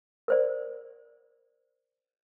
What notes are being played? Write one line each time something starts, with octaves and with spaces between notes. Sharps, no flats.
A#4 C5 D5